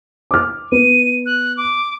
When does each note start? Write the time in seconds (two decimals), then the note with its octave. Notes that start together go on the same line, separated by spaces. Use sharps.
0.31 D6 F6
0.72 B3 D#7
1.26 F#6
1.57 D6